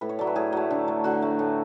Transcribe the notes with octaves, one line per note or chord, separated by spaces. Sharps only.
A2 B4
C#5
F#3 A3 D5
B4
A2 G#4
F#3 A3
D3
A3
D3 F#4
A3
A2